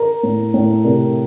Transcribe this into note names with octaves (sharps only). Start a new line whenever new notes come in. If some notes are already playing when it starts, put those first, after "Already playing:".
Already playing: A#4
A2
A2
C3 A#4